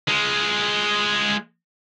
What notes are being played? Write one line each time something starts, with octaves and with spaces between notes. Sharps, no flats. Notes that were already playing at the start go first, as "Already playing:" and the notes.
G#3 F4